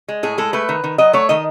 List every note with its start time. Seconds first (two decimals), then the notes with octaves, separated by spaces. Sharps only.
0.08 G#3
0.23 A2 G#4
0.38 G#3 A4
0.53 A3 B4
0.69 D#3
0.84 D#3
0.98 F#3 D#5
1.13 A3 C#5
1.29 D#3 D#5